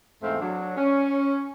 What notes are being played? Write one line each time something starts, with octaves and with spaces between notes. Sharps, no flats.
E2 G#2 A3 C4 C5 F5
F#3 D4
C#4